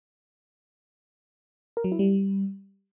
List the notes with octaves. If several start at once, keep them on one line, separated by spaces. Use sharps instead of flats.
A#4
F#3
E4
G3